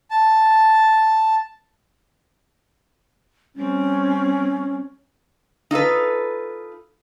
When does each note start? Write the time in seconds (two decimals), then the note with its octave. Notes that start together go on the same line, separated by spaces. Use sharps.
0.11 A5
3.56 G3 C4 C#4
5.71 D#4 F4 A4 B4